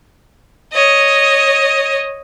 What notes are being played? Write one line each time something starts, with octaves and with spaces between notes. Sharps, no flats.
C#5 D#5